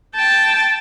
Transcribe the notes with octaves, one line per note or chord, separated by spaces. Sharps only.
G5 A5